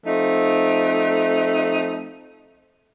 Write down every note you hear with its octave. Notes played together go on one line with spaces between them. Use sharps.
F3 A3 C4 D#4